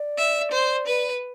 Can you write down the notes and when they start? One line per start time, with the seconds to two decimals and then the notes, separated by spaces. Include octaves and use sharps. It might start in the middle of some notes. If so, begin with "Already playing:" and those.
Already playing: D5
0.17 E5
0.51 C5
0.86 B4